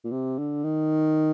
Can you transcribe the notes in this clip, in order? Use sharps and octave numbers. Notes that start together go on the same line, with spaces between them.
A#2
C3
D3
D#3